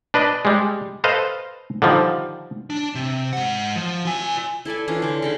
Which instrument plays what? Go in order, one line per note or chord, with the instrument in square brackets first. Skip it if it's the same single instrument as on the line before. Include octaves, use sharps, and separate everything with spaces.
[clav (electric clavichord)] D4 B4 D5 D#5
G3 G#3
A4 B4 C5 D#5 F5
D3 D#3 F3 G3
[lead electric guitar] D4
C3
G#2 F#5
F3
F4 G#5
[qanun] E4 A4 D5 G#5
E3 C#4 D4 F4
D3 D6
C#3 D#4 G5